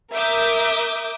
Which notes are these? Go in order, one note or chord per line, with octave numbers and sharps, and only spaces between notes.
A#4 E5 D6 D#6 G6